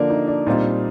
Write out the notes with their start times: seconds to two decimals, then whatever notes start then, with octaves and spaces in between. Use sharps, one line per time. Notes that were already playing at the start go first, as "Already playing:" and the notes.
Already playing: D3 F3 A#3 D4
0.10 D#4
0.27 D4
0.47 A#2 G3 C4 D#4 F4